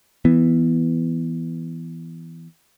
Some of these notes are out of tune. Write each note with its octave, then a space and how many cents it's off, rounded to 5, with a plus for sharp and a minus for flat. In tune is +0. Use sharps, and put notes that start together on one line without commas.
E3 +5 B3 +0